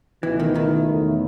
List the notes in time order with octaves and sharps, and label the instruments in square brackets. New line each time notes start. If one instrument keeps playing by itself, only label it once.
[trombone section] C#2 B2 A3 E4 [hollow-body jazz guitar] E3
[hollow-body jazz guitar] D#3
D#3
[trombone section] E2 B2 F#3 A3 E4